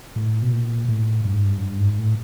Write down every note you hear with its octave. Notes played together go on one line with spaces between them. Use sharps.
A2
B2
A#2
A2
G2
G#2
G2
F#2
G2
G#2
A2